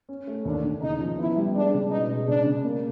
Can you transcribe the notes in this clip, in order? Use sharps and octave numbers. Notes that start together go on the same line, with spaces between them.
C#4
A3
D#2 D4
D#2
C#3 D#4
F3
B3 E4
G3
G#3 D4
C#3
B2 D#4
G#3
C#3 D4
C#3
A#3